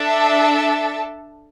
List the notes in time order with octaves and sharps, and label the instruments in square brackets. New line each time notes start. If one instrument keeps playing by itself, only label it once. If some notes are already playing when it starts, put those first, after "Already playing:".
Already playing: [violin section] D4 A4 E5 A5